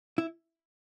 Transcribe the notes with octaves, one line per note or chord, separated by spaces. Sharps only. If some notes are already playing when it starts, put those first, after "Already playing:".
E4